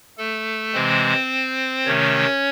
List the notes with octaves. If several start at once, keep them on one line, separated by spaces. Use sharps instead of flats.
A3 A4
C3 E3 G#3 C4 C5
C3 D#3 A3 C#4 C#5